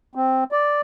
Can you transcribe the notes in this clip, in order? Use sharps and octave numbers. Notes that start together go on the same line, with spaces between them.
C4
D5